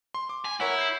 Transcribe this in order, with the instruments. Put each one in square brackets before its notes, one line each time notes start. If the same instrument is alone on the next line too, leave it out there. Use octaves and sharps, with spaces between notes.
[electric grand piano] C6
D6
[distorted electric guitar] G#5
[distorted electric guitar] E4 [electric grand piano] A#4 C#5 F#5
[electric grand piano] G6 C7